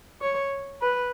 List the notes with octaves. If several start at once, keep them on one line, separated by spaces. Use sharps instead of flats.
C#5
B4